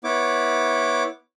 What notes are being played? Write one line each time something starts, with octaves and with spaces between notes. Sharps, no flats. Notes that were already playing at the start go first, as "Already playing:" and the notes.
B3 E4 C#5 D6